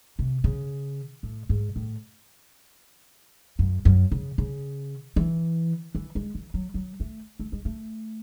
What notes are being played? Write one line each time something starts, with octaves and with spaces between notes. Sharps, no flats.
C3
C#3
A2
G#2
A2
F#2
F#2
C#3
C#3
E3
E3
G#3
E3
F#3
F#3
A3
A3
G#3
A3